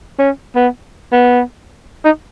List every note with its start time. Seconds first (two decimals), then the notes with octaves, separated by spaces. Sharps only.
0.19 C#4
0.56 B3
1.12 B3
2.05 D#4